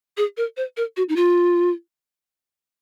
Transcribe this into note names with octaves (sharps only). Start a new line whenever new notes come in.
G#4
A#4
C5
A#4
F#4
D#4
F4